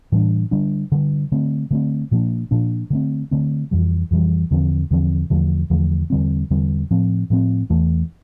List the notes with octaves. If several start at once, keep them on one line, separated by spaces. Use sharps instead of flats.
A2 E3 G3 D4
D3 G3 D4
D3 G3 D4
D3 A3 C4
D3 A3 C4
A#2 F3 A#3 D4
A#2 F3 A#3 D4
D3 A3 C4
D3 A3 C4
F2 E3 G3
F2 E3 G3
E2 D3 F3 C4
E2 D3 F3 C4
E2 D3 F3 A3
E2 D3 F3 A3
E2 D3 G3 C4
E2 D3 G3 C4
A2 F3 C4
A2 F3 C4
E2 E3 A3